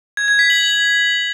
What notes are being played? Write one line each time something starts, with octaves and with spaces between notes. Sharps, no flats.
G#6
G#6
B6
F#7